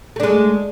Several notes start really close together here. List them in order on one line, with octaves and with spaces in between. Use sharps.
A3 D4 G#3